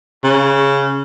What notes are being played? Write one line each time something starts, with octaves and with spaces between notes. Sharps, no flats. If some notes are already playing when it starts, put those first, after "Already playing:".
C#3